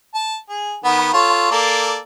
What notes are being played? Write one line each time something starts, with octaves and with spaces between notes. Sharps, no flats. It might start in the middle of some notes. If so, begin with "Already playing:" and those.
A5
G#4
D#3 B3 F#5
F4 A4 C#5
A#3 A4 D5